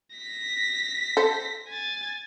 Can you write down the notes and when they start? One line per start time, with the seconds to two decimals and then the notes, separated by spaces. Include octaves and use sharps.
0.16 A#6 B6
1.17 A4 C5
1.69 G#5 A6